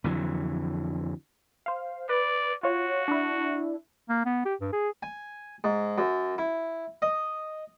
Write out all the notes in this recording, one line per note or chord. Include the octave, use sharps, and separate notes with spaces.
F2 D3 E3 F#3
C5 F5
B4 D5
F4 F#4 C#5
D4 E4
A#3
B3
G4
G2
G#4
G#5
G#2
F#2
E4
D#5